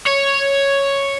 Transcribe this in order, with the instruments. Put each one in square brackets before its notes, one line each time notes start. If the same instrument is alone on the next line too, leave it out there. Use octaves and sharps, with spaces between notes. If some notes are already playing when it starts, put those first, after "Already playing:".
[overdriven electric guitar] C#5